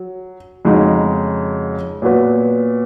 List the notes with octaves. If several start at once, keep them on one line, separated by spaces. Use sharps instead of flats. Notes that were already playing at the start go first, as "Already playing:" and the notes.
Already playing: F#3
F2 C#3 G#3 D#4 F#4
A#2 F#3 B3 F#4 B4